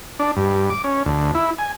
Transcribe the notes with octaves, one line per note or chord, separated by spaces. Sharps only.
D4
G2
D6
C#4
D2
E4
G#5